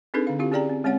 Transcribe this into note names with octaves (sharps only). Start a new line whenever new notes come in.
C4 D4 D#4 G#4 A4 B4
D3 F5
C4 E4 F4 G4 F5
C#4 G4 G#4 D5 G5 A#5
C4
G#3 C4 C#4 C#5 F#5